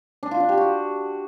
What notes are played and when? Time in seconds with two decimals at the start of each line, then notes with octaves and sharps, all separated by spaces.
0.23 D4
0.31 F4
0.40 D4
0.49 G4
0.58 F#4